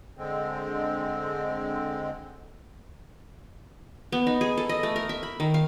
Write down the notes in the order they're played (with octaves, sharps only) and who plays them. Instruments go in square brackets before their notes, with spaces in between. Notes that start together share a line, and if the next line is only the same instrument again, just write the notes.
[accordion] D3 G#3 C4
[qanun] B3
D#4
G#4
A4
D#5
A3
A#4
E5
B5
D#3
F5